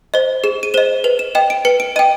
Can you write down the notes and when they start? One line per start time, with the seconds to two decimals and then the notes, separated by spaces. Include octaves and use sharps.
0.14 C5 D#5
0.44 G#4 E7
0.63 D#7
0.74 C5 D#5 E7
1.04 B4 F7
1.19 E7
1.35 D#5 G5 E7
1.50 D7
1.65 B4 C#7
1.80 D7
1.96 D#5 G5 D#7